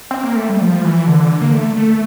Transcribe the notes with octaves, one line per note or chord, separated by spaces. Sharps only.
C4
A#3
A3
G3
F3
E3
D3
A#3
A3
A3